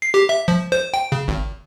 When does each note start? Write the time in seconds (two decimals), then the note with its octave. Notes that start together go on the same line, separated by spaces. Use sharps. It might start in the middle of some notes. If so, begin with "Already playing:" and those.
0.02 C7
0.14 G4
0.29 E5
0.48 F3
0.72 C5
0.94 G5
1.12 C#3
1.28 G#1